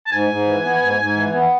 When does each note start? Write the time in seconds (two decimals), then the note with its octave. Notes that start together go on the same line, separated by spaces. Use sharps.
0.06 A5
0.12 G#2 G#5
0.30 G#2
0.48 E3
0.65 B3
0.82 G#2
0.99 G#2
1.17 E3
1.34 B3